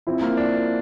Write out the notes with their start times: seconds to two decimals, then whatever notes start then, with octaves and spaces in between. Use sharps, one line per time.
0.07 F3 C4 E4
0.22 A#3
0.37 D4